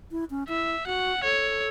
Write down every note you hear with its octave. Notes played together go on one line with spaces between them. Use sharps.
E4
C#4
E4 E5
F#4 F#5
A4 C#5